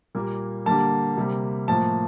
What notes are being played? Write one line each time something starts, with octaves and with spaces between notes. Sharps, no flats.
A#2 G3 A#3
D3 G3 A#3 A5
C3 G3 A#3
A2 F3 A#3 A5